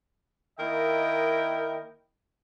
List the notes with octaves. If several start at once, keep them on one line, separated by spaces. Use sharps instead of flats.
D#3 A#3 E4 A#4 D#5 G5